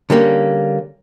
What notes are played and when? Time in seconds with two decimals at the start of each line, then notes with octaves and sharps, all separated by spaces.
0.10 D3 G3 A#3 C#4